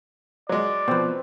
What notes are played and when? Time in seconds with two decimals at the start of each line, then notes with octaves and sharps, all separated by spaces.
0.49 F#3 G#3 D5
0.88 B2 F3 C4 B4